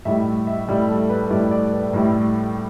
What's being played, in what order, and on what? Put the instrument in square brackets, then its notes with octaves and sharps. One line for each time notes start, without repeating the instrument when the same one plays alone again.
[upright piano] A2 G3 E4 E5
E5
A2 G3 E4 D5
A4
B4
A2 G3 E4 D5
D5
B4
A2 G3 E4